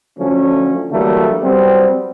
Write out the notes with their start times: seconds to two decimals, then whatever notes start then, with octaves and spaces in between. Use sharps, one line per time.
0.18 D3 F3 F#3 A3 C#4
0.91 D3 E3 F#3 G3 A3 A#3
1.43 F#3 G3 B3 C4